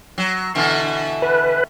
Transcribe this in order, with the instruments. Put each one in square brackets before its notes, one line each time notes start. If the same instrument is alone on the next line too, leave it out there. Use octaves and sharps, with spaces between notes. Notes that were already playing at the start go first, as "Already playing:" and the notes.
[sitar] F#3
B2 D3 E3
[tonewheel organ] B4